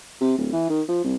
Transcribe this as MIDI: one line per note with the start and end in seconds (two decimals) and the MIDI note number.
0.21 0.34 48
0.38 0.51 26
0.53 0.65 52
0.69 0.82 51
0.88 1.02 53
1.04 1.16 36